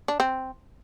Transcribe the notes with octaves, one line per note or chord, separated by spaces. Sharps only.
D4
C4